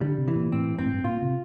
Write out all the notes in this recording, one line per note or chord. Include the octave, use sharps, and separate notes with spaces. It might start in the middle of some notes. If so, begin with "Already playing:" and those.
D3 G3
C3
E3
A#2
A2 C4
G2 C4
A2
G2
A#2 F4
C3